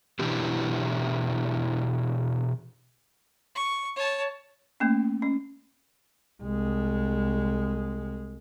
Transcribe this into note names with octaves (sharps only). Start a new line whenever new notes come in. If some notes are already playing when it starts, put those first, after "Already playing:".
B2 E3 D4 E4 G4
C#6
C#5 A5
A3 A#3 C#4
C#4
C2 G#3